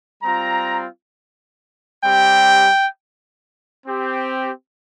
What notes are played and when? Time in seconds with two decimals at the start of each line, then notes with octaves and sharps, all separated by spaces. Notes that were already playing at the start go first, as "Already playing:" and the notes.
0.22 G3 C4 F4 A#5
2.04 G3 C4 G4 G5
3.87 C4 G4